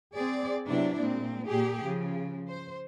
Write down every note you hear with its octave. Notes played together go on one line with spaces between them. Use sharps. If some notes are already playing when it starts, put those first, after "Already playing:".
C4 G#4 D5
C3 F#3 B3 D4 E4
A#2 G#3 C4
A#2 G4 G#4
C#3 F3
C5